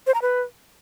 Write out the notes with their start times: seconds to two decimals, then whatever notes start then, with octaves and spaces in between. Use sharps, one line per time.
0.07 C5
0.14 A#5
0.22 B4